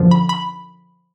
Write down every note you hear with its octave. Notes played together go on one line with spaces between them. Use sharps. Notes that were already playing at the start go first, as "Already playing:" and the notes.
Already playing: F#2 D3 F3
B5
B5